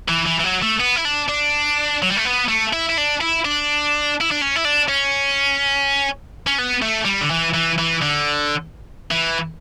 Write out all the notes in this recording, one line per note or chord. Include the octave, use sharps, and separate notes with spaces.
E3
E3
E3
F#3
A3
B3
E4
D4
D4
F#3
G3
A3
B3
A3
E4
E4
D4
E4
D4
E4
D4
C#4
E4
D4
C#4
C#4
B3
A3
G3
D3
E3
E3
E3
D3
E3